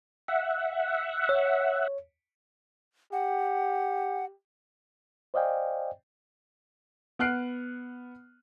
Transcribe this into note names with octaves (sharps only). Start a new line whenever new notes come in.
E5 F#5
C#5
G4 F#5
C5 D5 D#5 F5 G5 G#5
B3 F#5 F6 F#6 C7 D7